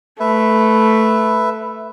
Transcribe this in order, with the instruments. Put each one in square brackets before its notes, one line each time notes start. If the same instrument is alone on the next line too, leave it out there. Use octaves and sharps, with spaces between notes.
[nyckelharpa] A3 [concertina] B4 E5